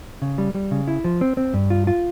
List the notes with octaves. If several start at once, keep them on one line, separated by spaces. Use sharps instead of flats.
C#3
G3
G3
C#3
E4
F3
C4
C4
G2
F4
F4